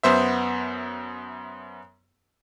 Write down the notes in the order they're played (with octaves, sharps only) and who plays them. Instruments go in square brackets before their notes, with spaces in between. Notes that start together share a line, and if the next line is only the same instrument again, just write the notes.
[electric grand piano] F#2 B3 C5 E5